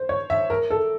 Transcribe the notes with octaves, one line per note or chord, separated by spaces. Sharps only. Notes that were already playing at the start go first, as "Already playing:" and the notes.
Already playing: C5
C#5
E5
A#4
A4